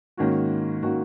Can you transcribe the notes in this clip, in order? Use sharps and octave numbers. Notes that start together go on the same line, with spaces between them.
G#2 D#3 A#3 C#4 F#4
D#3 A#3 C#4 F#4